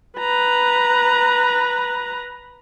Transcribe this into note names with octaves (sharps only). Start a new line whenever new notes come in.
B4 A#5